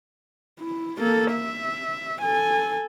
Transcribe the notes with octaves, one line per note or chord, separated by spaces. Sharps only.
E4
A#3 A4
E5
A4 G#5